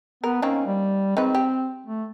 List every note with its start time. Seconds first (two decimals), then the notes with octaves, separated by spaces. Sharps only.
0.24 B3 A#4
0.42 D#3 A#3 C4 C#4
0.66 G3
1.17 D#3 G#3 C4 B4
1.35 G4
1.86 A3